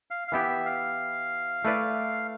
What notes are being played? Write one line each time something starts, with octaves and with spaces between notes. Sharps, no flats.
F5
F5
E3 B3 E4 G4 E5
F5
A3 E4 B4 D5